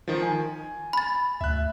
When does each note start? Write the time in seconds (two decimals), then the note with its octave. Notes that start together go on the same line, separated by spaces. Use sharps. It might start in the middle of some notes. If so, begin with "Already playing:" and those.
0.08 D#3 F3
0.23 G#5
0.93 B5 A6
1.41 D2 E5 F#6